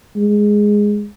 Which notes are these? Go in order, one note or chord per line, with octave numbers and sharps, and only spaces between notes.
G#3